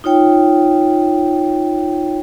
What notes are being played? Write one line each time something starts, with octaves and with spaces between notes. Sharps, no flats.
D#4 F4 C#5 G5